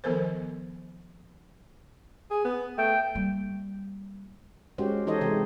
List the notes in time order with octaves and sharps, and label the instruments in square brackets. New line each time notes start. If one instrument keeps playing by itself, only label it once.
[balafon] D#3 F3 B3 A4 A#4 C5
[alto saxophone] G#4
B3
[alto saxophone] A3 [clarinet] G5
[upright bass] G3 A#3
[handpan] G#3 C#4 F#4 G4 C5
E3 D#4 A4 C5 C#5 D#5
C3 E3 G#3 C4 G#4